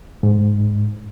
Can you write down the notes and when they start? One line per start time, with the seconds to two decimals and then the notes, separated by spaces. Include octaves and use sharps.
0.23 G#2